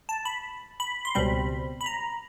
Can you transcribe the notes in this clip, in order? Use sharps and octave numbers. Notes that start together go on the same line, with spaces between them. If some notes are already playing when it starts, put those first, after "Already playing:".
A5
B5
B5
C6
C#2 B2 G3 C4 B5
B5
A#5